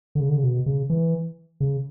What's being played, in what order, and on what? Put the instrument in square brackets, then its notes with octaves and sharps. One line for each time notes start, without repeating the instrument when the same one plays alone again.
[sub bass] D3
C#3
D3
C#3
B2
C#3
E3
C#3